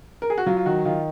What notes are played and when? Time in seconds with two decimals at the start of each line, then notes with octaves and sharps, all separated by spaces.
0.22 A#4
0.30 G#4
0.38 F#4
0.46 F#3 F4
0.57 F4
0.65 D#3 F#4
0.85 D#3 F4